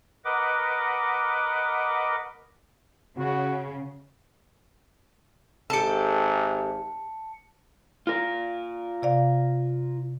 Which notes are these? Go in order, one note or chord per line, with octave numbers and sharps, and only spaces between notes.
A#4 B4 D#5 F#5 D6
C#3 F#4
G#1 G4 A4 A5 C#7
F4 A#4
C3 D5 F5